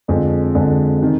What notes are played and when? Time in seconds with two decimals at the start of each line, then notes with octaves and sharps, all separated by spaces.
0.08 F2 D3 G#3
0.55 F2 D3 G#3
1.01 C3 D#3